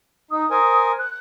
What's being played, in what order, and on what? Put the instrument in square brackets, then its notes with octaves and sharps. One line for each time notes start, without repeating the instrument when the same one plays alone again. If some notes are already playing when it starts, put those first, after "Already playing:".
[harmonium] D#4 [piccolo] D#6
[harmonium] A#4 C5 G#5
[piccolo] F#6